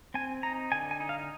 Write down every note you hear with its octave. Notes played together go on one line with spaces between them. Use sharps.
C4 G#5
D#4 A#5
D3 G#5
G#5
D#4
F5